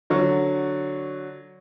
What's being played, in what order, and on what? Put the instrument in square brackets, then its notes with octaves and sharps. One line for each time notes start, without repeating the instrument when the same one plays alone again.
[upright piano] D3 F#3 C#6